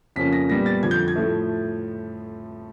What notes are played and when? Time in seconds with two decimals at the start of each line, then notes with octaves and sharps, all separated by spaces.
0.16 F2 C#3 F3 A#3 C#4 B6
0.33 A#6
0.50 A#2 G3 B3 A#6
0.66 A6
0.83 F2 D3 F3 G#6
0.91 G6
1.08 G#6
1.16 A2 F3 A3